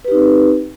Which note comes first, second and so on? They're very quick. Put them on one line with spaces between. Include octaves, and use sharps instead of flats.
B4 G4 D#4 C4